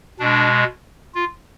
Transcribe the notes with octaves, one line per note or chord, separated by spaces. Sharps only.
B2 G#3 D4
F4